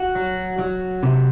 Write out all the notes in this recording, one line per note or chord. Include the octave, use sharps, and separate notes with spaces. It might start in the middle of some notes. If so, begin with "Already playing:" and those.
Already playing: F#4
F#3
F#3
C3